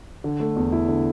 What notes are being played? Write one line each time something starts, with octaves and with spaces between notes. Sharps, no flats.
D3
A3
E2
E4
D3